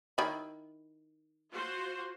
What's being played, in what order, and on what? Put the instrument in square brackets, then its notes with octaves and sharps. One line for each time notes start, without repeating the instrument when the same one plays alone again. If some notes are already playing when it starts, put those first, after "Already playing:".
[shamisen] D#3 E4 B5
[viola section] F4 F#4 C5